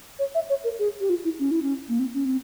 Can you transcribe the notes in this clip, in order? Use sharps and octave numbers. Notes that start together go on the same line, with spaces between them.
C#5
E5
C#5
A#4
G#4
G4
F4
E4
C#4
E4
C#4
A#3
C4
C#4
C4